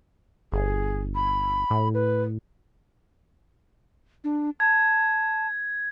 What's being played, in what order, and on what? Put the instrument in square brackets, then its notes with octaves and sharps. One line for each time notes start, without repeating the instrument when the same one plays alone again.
[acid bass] G1 [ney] G#4
[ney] B5
[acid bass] A2
[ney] B4
[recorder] D4
[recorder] A5 [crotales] G#6